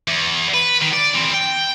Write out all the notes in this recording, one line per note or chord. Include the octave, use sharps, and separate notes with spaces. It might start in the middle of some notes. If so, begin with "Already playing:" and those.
E2
B4
D#3
D5
E3 C4
G5